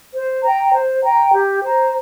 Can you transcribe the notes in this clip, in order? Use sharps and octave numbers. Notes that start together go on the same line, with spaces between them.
C5
G5 A#5
C5
G5 A#5
G4
C5 A#5